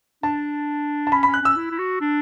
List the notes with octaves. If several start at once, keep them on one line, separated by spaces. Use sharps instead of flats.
D4 A5
A5
C#4 B5
C#4 B5
F#6
C#4 E6
E4
E4
F#4
D4